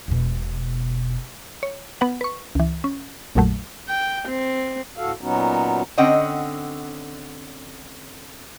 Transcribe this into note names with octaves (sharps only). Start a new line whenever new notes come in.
E1 B2
C#5
B3 B4 F#5
B4 C#6
C#2 E3
C#4
A#1 F2 A#2 F#3 A3
G5
C4
D2 A2 F#4 A4 F5
A#2 F#3 B3 C#4 D#4 F#4
D3 C4 C#4 D#5 F#5 G5